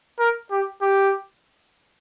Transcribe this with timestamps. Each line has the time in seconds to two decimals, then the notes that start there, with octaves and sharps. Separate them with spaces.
0.19 A#4
0.51 G4
0.82 G4